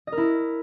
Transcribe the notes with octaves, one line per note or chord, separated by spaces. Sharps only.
D#5
A#4
E4